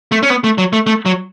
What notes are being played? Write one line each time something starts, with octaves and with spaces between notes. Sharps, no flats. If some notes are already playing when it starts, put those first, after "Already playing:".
A3
C#4
B3
A3
F#3
A3
A3
F#3